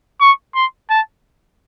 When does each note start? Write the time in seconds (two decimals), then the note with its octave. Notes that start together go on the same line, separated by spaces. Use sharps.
0.21 C#6
0.55 C6
0.90 A5